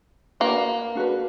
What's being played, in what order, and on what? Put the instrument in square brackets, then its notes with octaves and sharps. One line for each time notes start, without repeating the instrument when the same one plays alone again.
[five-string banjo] A#3 [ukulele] D4 F#4 B4
[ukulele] D4 F#4 B4